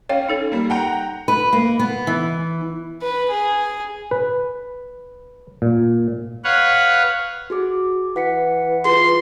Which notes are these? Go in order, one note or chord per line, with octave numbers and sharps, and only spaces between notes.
C#4 C#5 F5 G5
D#4 A4 C#5
G3 A#3
F#5 G5 A#5
B4
A#3
B3
E3
B4
G#4
B4
A#2
B4 C#5 F5 F#5
F#4 G#4 D6
E3 F#5 B6 C#7
F4 G#4 C6